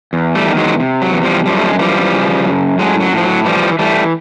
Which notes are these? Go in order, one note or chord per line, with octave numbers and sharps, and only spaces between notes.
E2
G3 A3
D#3
F#3 G#3
C3
F#3
E2
F3 G3
F#2 F3 G3
A3
G#3
E3 F3 G3
C#3
F#2
A2 F#3 G#3
F#3
A2 F3
F#3
E3 F3 G3
E3 G3 A3